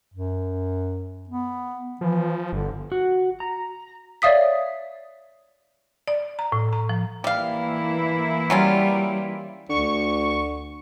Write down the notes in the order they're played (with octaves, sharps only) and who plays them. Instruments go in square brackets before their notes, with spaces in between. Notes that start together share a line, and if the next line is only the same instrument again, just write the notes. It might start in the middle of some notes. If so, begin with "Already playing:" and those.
[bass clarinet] F#2
B3
[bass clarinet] E3 [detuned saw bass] F3
[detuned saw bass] G1 [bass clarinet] D3
[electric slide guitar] F#4
A#5
[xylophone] C#5 D5 E5 F5 D#6 B6
[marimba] D5
A#5
A2
A#5
F3
[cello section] E3 A#3 E4 [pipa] G3 F5
[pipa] F#3 C#4 F4 [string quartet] G3
[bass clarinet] D2 [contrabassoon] D3 [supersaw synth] C#6